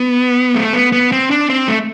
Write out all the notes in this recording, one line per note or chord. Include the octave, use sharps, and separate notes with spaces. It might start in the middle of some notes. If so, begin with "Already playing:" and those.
Already playing: B3
A3
B3
B3
C4
D4
C4
A3